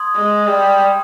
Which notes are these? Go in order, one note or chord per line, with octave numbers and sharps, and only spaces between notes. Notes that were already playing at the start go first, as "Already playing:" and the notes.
Already playing: C6 D#6 G#6
G#3
G3